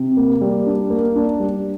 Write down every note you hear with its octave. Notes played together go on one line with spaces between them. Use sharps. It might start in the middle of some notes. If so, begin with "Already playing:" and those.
Already playing: C3
A#3
G3
D4
A#3
D4
G3